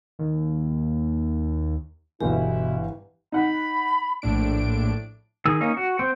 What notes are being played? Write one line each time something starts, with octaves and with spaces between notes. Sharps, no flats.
D#2
G1 B2 E3 E4 G4
D#4 F#5 B5
A#1 A2 D4 D7
D#3 G#4 E6
A#3 C#4 D#4
F#4
C4 C5 G5